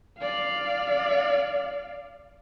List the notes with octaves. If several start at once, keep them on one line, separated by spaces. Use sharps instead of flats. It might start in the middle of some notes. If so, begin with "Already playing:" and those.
D5 F5